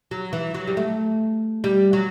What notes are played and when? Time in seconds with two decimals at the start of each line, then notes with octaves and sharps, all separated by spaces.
0.11 F#3
0.33 E3
0.54 F#3
0.67 G3
0.77 A3
1.64 G3
1.93 F#3